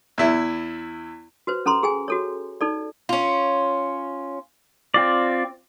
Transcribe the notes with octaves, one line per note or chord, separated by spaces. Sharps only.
E2 E4
F#4 B4 C5
C#4 A4 A#5 C6
G#4 G5 G#5
F#4 A4 C#5
D#4 A4 D5
C#4 F4
C4 F4 D5